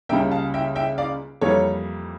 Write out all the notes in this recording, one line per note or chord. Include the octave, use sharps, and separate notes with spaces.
C#2 C#3 G3 A#3 E5 G5
F5 A5
E5 G5
E5 G5
D5 F5
F2 E3 G3 A#3 A4 C#5